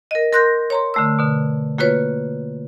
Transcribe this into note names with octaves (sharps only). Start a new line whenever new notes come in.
A#4 D#5
A#4 C6 F#6 G6 A#6
C#5 A#5 C6
D3 A3 E6
B2 D3
A#3 F4 F#4 B4 C#5